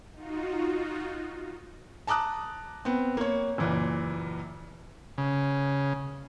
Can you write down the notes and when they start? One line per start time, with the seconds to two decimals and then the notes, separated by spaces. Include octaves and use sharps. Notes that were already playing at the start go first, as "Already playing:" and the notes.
0.13 D#4 F4 F#4
2.07 A5 A#5 D6 D#6 F#6
2.85 B3 C4
3.17 A#3 C#5
3.58 F#1 A#2 E3
5.18 C#3